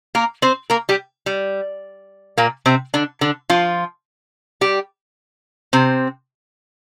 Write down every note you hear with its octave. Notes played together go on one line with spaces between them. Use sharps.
A#3 A#4
C4 C5
A#3 A#4
G3 G4
G3
A#2 A#3
C3 C4
D3 D4
D3 D4
F3 F4
G3 G4
C3 C4